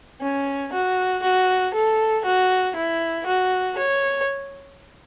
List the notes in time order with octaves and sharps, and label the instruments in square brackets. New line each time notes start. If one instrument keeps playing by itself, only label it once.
[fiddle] C#4
F#4
F#4
A4
F#4
E4
F#4
C#5